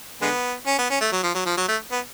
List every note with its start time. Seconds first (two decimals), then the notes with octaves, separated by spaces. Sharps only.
0.22 D3 G#3 B3
0.67 C#4
0.78 B3
0.90 C#4
1.01 A3
1.12 F#3
1.23 F3
1.35 F#3
1.46 F3
1.57 F#3
1.68 A3
1.92 B3